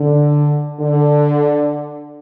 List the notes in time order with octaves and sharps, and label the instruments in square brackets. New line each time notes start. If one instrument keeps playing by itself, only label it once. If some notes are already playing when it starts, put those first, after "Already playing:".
Already playing: [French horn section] D3
D3